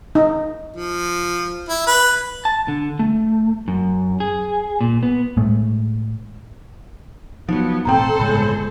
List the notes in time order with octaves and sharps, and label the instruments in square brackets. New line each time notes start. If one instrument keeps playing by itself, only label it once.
[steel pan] D#4
[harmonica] F3
E4
B4
[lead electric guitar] A5
D3
A3
F#2
G#4
A#2
B3
[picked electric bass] A2 G#3 A3
[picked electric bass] F3 F#3 [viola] B3 [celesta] D#4
[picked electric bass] E1 A2 C4 [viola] A4 C5 [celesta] G5 A#5
[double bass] G1 G#3 [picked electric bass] A2 C#3 [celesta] B5